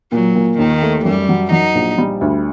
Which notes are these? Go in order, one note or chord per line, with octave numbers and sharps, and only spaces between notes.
A#2 F#3
A#2
D#2 D#3
A3
F#2 G3
F#3
F#3 D#4
A#1
G3
D2